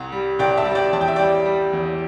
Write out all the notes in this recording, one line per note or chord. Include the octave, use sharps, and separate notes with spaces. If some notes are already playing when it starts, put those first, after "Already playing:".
Already playing: C2
G3
C2 D5 G5
E5 A5
G3
D5 G5
E2 A5
G5
E5
G3 D5 G5
G3
E2